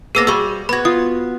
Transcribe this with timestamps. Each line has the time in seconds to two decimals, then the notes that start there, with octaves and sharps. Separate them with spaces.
0.15 A#3 B3 D4 G#4 E6 A#6
0.27 G3 F#4 G#4 C#6 E6
0.69 B3 F#4 B5 G#6
0.85 F4 D#6